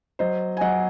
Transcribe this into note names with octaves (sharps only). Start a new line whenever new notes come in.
F#3 C5 D#5
G#5
F#3 D#5 F#5